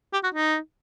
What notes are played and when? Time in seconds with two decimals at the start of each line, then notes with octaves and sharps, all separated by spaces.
0.13 G4
0.23 F#4
0.34 D#4